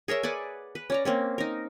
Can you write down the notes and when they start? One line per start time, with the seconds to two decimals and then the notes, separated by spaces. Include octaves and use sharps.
0.08 G#4 A#4 C#5 E5
0.23 B4 D5 F#5 G#5
0.75 B4
0.90 C#4 D5 A#5
1.05 A#3 C4 C#4
1.38 D#4 A#4